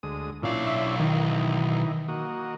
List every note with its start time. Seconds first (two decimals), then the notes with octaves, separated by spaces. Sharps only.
0.03 D2 G#3 D#6
0.43 B1 A#2 C#4 D4 E4 F5
0.67 E5
1.00 D#3 E3 D#4
2.08 A#3 F#4 D#5